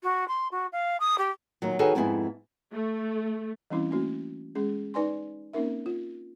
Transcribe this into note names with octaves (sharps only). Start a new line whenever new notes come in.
F#4
C6
F#4
F5
D#6
G4
A#2 D#3 F#3
D#3 F#4 G#4 A4 B4 C#5
F2 G#2 B3 E4 G#4
A3
E3 G3 C4 C#4 E4
A3 A#3 C#4 F#4
G#3 C#4 G#4
D#4 B4 D5 G#5 C6
A#3 C4 C#4 D#4 A#4 E5
F4